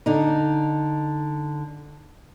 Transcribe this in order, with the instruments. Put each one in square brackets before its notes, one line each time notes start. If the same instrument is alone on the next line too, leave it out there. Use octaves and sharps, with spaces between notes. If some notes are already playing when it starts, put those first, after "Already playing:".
[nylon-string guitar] D3 D#4